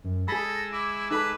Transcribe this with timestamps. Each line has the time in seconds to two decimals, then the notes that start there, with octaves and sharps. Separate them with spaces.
0.04 F#2
0.28 G#3 G#4 A4 B5 E6 A#6
0.73 E4 D6
1.11 D#4 A4 B4 B5